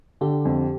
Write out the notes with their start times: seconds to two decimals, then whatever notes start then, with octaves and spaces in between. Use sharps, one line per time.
0.21 D3 G4
0.45 F2